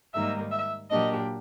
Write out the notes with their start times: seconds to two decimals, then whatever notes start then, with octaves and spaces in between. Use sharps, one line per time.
0.14 G#2 D#3 G3 A#3 D#4 E5
0.51 E5
0.90 A#2 F#3 A#3 D4 G4 D#5